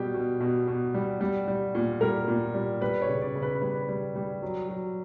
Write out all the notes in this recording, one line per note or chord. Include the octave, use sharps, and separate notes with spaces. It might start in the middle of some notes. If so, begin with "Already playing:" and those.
Already playing: B2 G3 G4
B2
B2
B2
G3
G3
G3
A#2
G3 A#4
A#2
G3
G3 B4
C#5
C#3
D5
C#3
B4
G3 B4
G3
G3
F#3
F#3